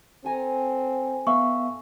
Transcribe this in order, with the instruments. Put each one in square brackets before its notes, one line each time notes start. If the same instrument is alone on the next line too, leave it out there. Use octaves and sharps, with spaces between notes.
[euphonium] C4 [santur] A4 G#5 A#5
[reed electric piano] B3 E5 F5 [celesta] C#6